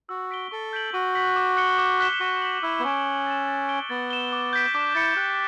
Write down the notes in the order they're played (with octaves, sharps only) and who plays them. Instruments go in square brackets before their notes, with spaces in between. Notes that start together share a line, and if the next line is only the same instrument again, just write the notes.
[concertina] F#4 [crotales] E6
[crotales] B6 D7 G7
[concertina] A4 [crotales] C#6
[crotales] G6 B6 D7 F#7
[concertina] F#4 [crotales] C#6
[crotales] F#6 B6 F#7
D6
F#6 C#7 G7
D6
F#6 B6 E7 G7
[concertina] F#4 [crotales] C#6
[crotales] F#6 B6 F#7
[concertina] E4 [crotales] E6
[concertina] B3
[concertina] C#4 [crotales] B6 D7
[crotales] D6
A6 E7
A6
D7 G7
[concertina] B3 [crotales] A6
[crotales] E7 G7
D6
G6 B6 D7
[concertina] D4 [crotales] D6
[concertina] E4 [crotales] A6 C#7
[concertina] G4 [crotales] F#6